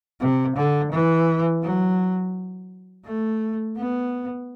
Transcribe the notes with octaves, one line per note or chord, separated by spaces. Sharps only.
C3
D3
E3
F#3
A3
B3